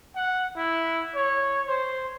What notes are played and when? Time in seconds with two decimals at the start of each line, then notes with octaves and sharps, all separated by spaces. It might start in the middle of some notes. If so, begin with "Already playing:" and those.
0.16 F#5
0.56 E4
1.15 C#5
1.67 C5